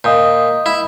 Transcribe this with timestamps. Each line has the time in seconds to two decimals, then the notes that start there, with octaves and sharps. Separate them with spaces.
0.04 A#2 D#5 D#6 G6
0.66 E4